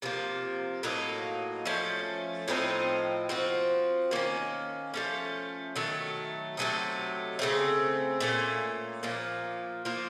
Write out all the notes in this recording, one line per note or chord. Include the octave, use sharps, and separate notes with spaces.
C3 F3 A#3
A2 F#3 A#3 D#4
F3 A3 C#4
A2 F3 C4 D#4
F3 C4 F#4
D#3 A#3 C#4
F3 A3 C#4
D#3 F#3 A3
C3 F#3 A3 D#4
C#3 A3 C4
A#2 A3 C#4
A#2 F3 A#3
F3 A#3 F4